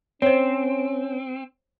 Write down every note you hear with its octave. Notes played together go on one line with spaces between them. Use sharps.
C4 C#4 C5 C#5